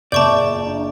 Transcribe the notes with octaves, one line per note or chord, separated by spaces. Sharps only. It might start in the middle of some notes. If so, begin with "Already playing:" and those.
F#1 A#2 D5 E5 A5 C#6 G6
D4 A#5